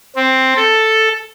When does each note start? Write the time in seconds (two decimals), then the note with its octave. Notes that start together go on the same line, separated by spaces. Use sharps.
0.16 C4
0.56 A4